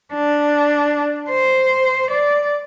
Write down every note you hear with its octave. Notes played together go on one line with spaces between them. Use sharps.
D4
C5
D5